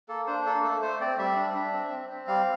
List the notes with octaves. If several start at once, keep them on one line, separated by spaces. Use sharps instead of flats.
A#3 A4
D4 C5
A#3 A4
A3 A4
A3 C5
C4 D5
G3 E5
D4
D4
C4
C4
C4
G3 F5